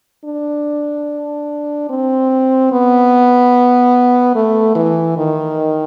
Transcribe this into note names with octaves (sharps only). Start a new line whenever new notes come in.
D4
C4
B3
A3
E3
D#3